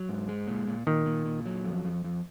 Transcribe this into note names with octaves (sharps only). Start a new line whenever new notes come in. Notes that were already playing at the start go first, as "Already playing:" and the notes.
Already playing: F#3
G#2
G#3
A#2
A#2
A#2 D#3
A#2
A#2
F#3
F2
F2
F2